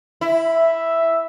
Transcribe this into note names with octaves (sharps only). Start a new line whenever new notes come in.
E4
E5